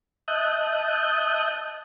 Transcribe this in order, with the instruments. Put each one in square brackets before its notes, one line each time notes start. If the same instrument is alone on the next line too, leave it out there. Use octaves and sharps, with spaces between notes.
[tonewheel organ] D#5 E5 A5 D#6 F#6 G6